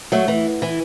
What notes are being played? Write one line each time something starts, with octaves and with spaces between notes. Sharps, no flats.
F#3 A3
E3
E3